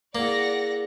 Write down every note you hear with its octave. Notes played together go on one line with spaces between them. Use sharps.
A#3 E4 G#4 D5 F#5 D6 A#6